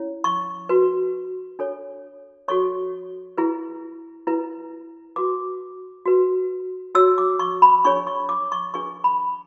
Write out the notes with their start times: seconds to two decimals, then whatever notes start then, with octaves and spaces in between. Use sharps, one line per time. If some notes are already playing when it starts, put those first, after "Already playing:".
Already playing: C#4 E4 C#5
0.24 C#6
0.69 F#4 B4
1.59 D4 A4 C#5
2.48 F#4 A4 C#5 C#6
3.38 E4 G#4 B4
4.27 E4 B4
5.16 F#4 B4 D6
6.06 F#4 B4
6.95 F#4 C#5 E6
7.18 D6
7.39 C#6
7.62 B5
7.85 D4 G#4 C#5 C#6
8.07 C#6
8.29 D6
8.52 C#6
8.74 D4 G#4 B4 C#6
9.04 B5